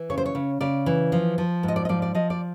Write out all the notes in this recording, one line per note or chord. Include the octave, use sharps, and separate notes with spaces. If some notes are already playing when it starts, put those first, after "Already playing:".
Already playing: E3
C#3 C#5
C5
C#5
C#3
C#3 D5
E3
F3
F3
G#2
D#5
D5
D#5
F3 D5
D5
F3 D#5
D5